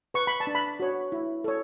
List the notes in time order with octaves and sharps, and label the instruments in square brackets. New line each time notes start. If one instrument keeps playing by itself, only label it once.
[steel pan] B4 C#6
B5
A5
D4
B5
F#4 C#5
E4
A4 C#5